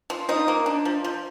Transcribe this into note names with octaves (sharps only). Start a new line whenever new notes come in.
F3
F3 D#4
A#3
D4
F3
F3